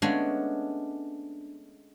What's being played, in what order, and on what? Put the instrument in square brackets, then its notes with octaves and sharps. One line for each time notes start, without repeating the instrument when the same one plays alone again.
[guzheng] G#3 A3 C#4 [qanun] B3 D4